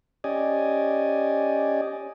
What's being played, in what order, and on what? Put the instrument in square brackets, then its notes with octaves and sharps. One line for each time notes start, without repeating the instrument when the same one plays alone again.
[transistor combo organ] C#4 G4 D5 D#5 G#5